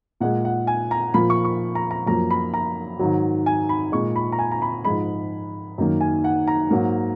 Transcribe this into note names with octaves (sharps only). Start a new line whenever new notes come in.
A#2 G#3 F#5
F#5
G#5
A#5
A#2 F3 A#3 B5
C#6
C#6
A#5
A#5
F#2 F3 A#3 A#5
B5
A#5
G#2 D#3 F#3
G#5
B5
A#2 G#3 C#6
B5
A#5
G#5
A#5
B5
G#2 F3 G#3 B5
F#2 D#3 A#3
G#5
F#5
A#5
G#2 F#3 A#3